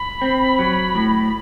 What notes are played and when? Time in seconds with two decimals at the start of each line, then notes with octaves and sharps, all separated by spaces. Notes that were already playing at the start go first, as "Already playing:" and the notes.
Already playing: B5
0.22 C4
0.59 F#3
0.95 A2